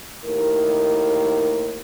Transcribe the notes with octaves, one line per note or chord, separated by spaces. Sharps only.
D#2 A2 D#4 A#4